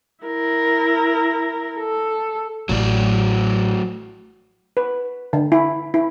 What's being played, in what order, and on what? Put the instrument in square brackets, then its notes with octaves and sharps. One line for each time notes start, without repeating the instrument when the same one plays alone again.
[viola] E4 A#4
A4
[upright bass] A1 [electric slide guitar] F#3 A3 D5
[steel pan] B4
D3
E4
E4